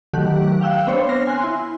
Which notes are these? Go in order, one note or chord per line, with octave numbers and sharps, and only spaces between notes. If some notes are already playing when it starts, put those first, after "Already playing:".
D#3 F#3 A3 G4 F#6
F5 G5 E6 F#6
B3 C4 D4 C5 C#5
F6 A#6 C7
G#5 C6 F#6
E4